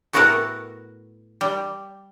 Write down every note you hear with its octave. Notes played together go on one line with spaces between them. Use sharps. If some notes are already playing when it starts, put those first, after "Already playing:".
A2 B3 F#4 A4 A#4 F#5
G3